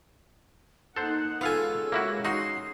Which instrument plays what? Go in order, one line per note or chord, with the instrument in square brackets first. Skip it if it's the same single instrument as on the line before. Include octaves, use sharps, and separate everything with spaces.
[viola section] A#3 D#4 F#5 [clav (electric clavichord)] A4 C5 [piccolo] F#6
[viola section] G#3 C#4 [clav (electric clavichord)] B3 F5 G#5 [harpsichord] F4 A4 [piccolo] E6
[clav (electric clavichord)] A#3 E4 F#4
[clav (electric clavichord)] D#4 F#4 [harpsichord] C6 [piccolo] C7